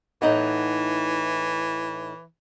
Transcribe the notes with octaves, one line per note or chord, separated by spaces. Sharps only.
A2 E3 D#4 F#5